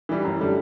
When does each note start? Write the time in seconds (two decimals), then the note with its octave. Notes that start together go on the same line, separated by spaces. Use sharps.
0.09 E3 G3
0.24 F#2
0.40 D3 G3